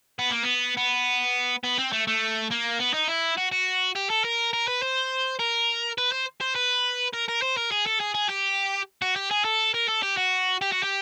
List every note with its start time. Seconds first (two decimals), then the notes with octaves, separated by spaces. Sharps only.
0.19 B3
0.31 A#3
0.43 B3
0.77 B3
1.64 B3
1.78 C4
1.93 A3
2.07 A3
2.51 A#3
2.79 B3
2.94 D#4
3.08 E4
3.38 F#4
3.52 F#4
3.95 G4
4.10 A4
4.24 A#4
4.53 A#4
4.68 B4
4.83 C5
5.40 A#4
5.98 B4
6.12 C5
6.41 C5
6.56 B4
7.13 A#4
7.28 A#4
7.42 C5
7.57 A#4
7.71 G#4
7.86 A4
8.00 G#4
8.15 G#4
8.30 G4
9.02 F#4
9.16 G4
9.31 G#4
9.45 A4
9.74 A#4
9.88 A4
10.03 G4
10.17 F#4
10.61 G4
10.72 F#4
10.83 G4